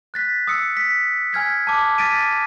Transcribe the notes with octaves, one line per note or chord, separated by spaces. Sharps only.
F#6 A6 B6
D#6 E6 C#7
B6
G#5 F6 G#6 B6
A5 D6
F6 A6 B6 D7 D#7